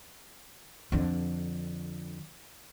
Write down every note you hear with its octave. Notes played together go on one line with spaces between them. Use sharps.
F2 D3